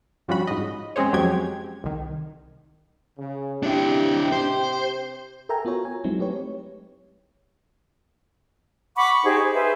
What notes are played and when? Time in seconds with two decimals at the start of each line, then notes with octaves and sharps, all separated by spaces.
0.28 G2 F3 G3 C#4 F#4 B5
0.47 G#2 D#5
0.96 G#3 C4 C#4 G#4 C5 C#5
1.13 F2 F#3 G#3 G4 G5 G#6
1.84 C2 D#3
3.18 C#3
3.63 C3 D4 E4 G4
4.32 C5
5.49 A4 A#4 E5 G5 G#5 A#5
5.65 B3 F4 F#4 C#5
5.85 G#5
6.04 F#3 G#3 C4 D#4 E4
6.19 A3 G4 B4 C#5
8.96 F#5 B5 C#6 D6
9.11 C#6
9.24 D#4 G4 G#4 C5
9.39 G#4
9.54 G#4 B4 C5 E5